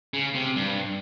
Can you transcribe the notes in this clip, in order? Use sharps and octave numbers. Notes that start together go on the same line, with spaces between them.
C#3
C3
G2